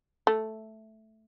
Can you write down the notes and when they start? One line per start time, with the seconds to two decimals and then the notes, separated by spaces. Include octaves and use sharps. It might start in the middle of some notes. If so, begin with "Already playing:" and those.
0.27 A3